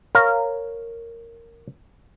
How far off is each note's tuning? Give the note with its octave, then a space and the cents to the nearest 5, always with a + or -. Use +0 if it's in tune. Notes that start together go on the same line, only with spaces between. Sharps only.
A#4 -10 C#5 +0 F5 +0